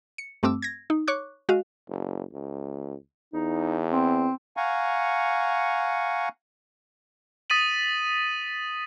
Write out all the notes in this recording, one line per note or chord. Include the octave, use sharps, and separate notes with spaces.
C#7
G2 A3 C4 D6 E6
G#6 A#6
D#4
C#5 C#6 D6 F#6
G#3 F#4 D#5 F5
F#1
C#2
E2 D#4
C4
F5 F#5 G#5 A#5 C#6
D#6 A6 B6 D#7 F#7